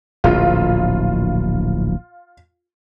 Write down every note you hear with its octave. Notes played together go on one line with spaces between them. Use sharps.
D1 A#1 F4